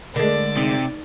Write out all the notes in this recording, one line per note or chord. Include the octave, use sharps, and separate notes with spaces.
D3 G#3 A3 A#4 D5
C3 D#4